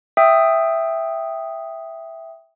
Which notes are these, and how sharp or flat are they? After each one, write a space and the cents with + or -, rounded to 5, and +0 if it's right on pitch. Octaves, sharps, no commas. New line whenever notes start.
E5 +0 G5 +0 D#6 +0